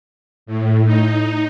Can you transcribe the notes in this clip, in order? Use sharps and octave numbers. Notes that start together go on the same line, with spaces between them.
A2
D#4